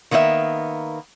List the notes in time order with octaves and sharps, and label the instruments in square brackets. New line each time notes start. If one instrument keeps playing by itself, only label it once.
[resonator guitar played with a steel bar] D#3 A#3 B3 F#4 E5